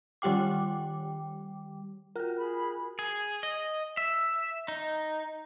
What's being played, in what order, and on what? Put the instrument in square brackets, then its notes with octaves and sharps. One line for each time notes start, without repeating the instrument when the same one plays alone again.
[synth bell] D#3 G3 G4 G5 D6
[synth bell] F4 F#4 [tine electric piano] A#4
[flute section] G#4 B5
[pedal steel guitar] G#4
D#5
E5
D#4